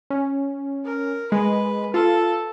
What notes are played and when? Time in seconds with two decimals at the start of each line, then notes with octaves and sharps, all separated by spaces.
0.10 C#4
0.85 A#4
1.32 G#3 B4
1.94 F4 A4